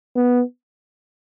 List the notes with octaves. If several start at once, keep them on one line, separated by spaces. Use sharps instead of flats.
B3